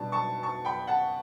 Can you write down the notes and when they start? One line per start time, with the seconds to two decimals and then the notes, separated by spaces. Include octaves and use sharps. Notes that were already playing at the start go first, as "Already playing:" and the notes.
Already playing: B2 G3 D4 A5
0.12 A5 C#6
0.43 A5 C#6
0.65 G5 B5
0.87 F#5 A5